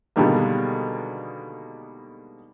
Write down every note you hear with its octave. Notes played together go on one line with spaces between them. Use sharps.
B2 D3 D#3 G3 G#3 A#3